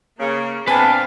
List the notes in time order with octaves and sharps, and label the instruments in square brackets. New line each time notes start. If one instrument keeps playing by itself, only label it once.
[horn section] C#3 [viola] A#3 A#5
[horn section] B3 D4 [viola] C4 F5 [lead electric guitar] B4 A5 [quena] G#5